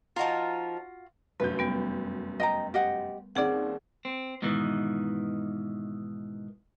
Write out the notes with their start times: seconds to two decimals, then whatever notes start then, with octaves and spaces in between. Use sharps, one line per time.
0.16 F3 D#4 F4 F#4 A#4
1.40 F1 F#2 B4 G6
1.59 G3 B3
2.40 D#5 G5 A#5
2.74 G4 D#5 F#5
3.35 D#2 C4 C#4 G#4 D5 F#5
4.05 C4
4.42 G#2 B2 D#3 E3